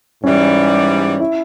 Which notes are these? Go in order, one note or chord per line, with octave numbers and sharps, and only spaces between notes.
G#2 E3 G3 C#4
E4